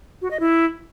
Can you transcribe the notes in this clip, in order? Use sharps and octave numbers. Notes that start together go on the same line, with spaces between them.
F#4
D#5
E4